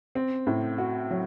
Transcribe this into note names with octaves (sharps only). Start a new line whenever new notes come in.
C4
A2
F#4
F#3